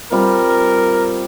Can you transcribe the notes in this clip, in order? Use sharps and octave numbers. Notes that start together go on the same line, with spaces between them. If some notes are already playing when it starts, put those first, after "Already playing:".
G3 C4 F4 A#4